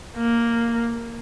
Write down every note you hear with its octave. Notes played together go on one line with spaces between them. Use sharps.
A#3